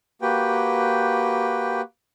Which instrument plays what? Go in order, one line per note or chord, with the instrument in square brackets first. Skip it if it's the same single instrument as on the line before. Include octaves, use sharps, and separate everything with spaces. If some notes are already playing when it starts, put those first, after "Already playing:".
[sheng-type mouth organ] A#3 F#4 G4 B4 G5